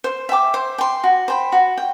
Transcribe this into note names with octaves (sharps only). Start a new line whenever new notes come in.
C5
E5 G5 D6
C5
G5 C6
F#4
C5 G5 B5
F#4
G5